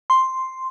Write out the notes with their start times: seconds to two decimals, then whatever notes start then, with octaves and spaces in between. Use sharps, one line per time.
0.10 C6